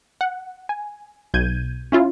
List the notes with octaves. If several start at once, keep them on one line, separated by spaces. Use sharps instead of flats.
F#5
G#5
B1 G6 G#6 D#7
C#4 E4 F4